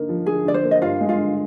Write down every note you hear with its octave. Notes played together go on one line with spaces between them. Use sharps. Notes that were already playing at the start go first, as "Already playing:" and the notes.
Already playing: D3 A#3 D#4
F3
D3 G#4
D3 D5
C5
A#3
D#5
G2 F4 F5
G#3
F4 F5
D3